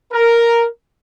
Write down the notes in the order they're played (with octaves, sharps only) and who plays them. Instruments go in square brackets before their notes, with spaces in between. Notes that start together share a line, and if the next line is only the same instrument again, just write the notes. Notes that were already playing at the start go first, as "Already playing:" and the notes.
[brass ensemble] A#4